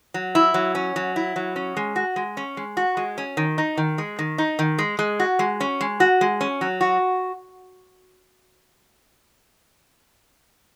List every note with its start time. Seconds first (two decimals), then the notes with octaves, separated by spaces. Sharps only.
0.14 F#3
0.35 E4
0.54 F#3
0.75 C#4
0.96 F#3
1.16 E4
1.36 F#3
1.56 C#4
1.77 G#3
1.96 F#4
2.16 G#3
2.37 C#4
2.57 G#3
2.77 F#4
2.97 G#3
3.18 C#4
3.37 D#3
3.58 D#4
3.77 D#3
3.98 G#3
4.19 D#3
4.38 D#4
4.59 D#3
4.79 G#3
4.99 G#3
5.19 F#4
5.39 G#3
5.61 C#4
5.81 G#3
6.00 F#4
6.21 G#3
6.41 C#4
6.61 F#3
6.81 F#4